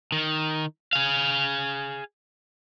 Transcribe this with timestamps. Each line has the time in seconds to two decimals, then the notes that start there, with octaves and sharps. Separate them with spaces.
0.12 D#3
0.93 G#4 F5